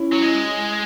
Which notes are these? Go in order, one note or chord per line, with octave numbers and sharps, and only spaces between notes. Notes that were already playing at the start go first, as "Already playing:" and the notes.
Already playing: C#4 E4
F#3
G#3